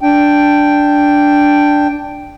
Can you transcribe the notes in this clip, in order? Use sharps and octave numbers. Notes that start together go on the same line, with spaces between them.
D4 G5